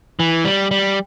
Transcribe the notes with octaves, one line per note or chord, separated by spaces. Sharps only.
E3
G3
G3